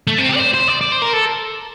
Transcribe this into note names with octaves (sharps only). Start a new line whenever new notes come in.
A3
C4
G4
D5
C5
C5
D5
D5
C5
A#4
A4